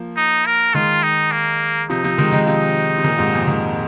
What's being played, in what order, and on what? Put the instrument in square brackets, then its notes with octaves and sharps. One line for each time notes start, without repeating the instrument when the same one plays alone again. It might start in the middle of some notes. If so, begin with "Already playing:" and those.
Already playing: [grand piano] F3 A#3
[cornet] D#4
A#4
[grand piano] D#3 G#3 [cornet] F4
[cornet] D#4
A#3
[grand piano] C3 F3 [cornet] D#4
[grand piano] C3 F3
D#3 G#3
D#3 G#3
[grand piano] C3 F3 [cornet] D#4
[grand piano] C3
A#2 D#3
G#2 C3
F2 A#2
D#3 G#3